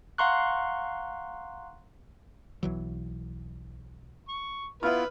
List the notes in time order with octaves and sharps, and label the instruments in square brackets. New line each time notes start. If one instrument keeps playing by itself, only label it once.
[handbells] F5 F#5 A#5 C6 C#6 F#6
[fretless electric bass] B1 E3 F#3
[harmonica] C#6
[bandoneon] B3 E4 F4 [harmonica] B4 [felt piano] E5 F6